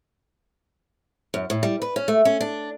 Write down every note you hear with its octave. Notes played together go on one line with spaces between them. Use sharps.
F#2
A2
G3
B4
C#4
A3
C#4
D4